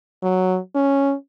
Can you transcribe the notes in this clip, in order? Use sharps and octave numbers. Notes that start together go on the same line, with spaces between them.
F#3
C#4